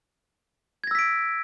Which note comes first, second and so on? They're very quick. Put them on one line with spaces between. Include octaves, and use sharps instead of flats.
G#6 A#6 E6 B6 D7